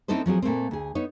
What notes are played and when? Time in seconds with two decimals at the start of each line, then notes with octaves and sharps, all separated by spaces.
0.08 C4 C#4 D#4 E4 A4 C5
0.26 F3 F#3 C4 G#4
0.42 A#2 A3 A#3 C4
0.71 D2 G#4
0.95 B3 D#4 C#5